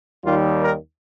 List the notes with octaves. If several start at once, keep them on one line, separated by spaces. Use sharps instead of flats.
D#2 D#3 G3 F4
A#4